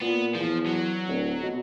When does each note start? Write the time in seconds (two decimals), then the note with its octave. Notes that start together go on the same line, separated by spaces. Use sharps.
0.02 A#2 B3
0.35 E2 F3
0.66 F#3
1.08 D1
1.42 B2